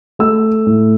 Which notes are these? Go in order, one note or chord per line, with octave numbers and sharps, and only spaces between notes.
A3 E6
A2